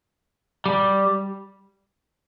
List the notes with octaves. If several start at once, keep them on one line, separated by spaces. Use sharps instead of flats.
G3